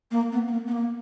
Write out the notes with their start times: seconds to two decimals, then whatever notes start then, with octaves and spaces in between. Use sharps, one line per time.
0.11 A#3
0.32 B3
0.47 B3
0.52 A#3
0.67 B3
0.72 A#3